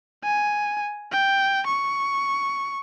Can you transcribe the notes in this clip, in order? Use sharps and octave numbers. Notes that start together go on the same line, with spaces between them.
G#5
G5
C#6